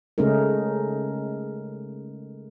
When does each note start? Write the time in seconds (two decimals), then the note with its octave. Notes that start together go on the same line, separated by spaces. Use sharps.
0.18 C#3 G#3 A3 C#4 D#4 A#4